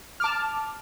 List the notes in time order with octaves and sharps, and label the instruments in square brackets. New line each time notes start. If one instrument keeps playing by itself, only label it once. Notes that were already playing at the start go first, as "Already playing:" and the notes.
[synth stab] A5 D6 F6